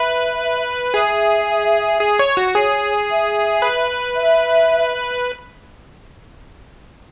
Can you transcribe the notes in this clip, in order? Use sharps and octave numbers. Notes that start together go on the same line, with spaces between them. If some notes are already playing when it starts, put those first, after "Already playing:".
Already playing: B4 E5
G#4 E5
G#4
C#5
F#4
G#4 C#5
E5
B4
E5